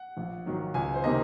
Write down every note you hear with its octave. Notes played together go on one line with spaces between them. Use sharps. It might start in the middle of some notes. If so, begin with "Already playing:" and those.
Already playing: F#5
A#1
G#2 D#3 F#3
C#2 G#5
C5
C3 D#3 A#3 D#5